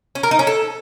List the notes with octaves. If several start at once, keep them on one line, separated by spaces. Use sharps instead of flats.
C#4
A#4
D#4
C#4
A4